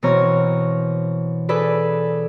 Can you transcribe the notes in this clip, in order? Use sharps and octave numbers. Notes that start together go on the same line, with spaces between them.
B2 E3 C4 C#5 A#5 F6
G#4 A4 B4 D5